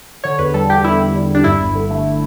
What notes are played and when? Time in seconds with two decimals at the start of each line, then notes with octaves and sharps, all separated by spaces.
0.24 D3 C#5
0.39 E2 B4
0.54 G3 A4
0.69 E2 G4
0.84 D3 E4
0.99 E2
1.15 G3
1.30 E2 D4
1.44 G2 E4
1.60 G1
1.75 D3
1.90 A3